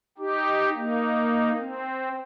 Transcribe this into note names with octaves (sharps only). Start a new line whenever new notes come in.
D#4 G4
A#3 D#4
C4